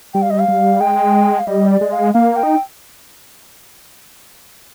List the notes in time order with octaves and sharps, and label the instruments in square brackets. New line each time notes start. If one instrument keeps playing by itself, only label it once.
[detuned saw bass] G3 [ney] G5
[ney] F5
D#5
F5
[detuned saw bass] G3
[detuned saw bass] G#3 [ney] G5
[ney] F5
[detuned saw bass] G3 [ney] D#5
[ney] D5
[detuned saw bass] G#3
[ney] F5
[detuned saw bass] A#3 [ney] F5
[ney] G5
[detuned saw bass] D#4